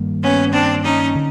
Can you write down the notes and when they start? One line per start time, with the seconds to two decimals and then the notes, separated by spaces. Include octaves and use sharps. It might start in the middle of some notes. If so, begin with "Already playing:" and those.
Already playing: G2 D#3 G3 A#3
0.22 B3 C#4
0.52 C4 D4
0.84 C#4 D#4
1.15 D3